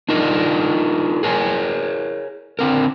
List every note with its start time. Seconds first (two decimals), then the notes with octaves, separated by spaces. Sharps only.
0.09 D4 D#4 F4 A#4 D5 D#5
1.23 G#4 A#4 C#5 G#5
2.59 D3 C4 A#4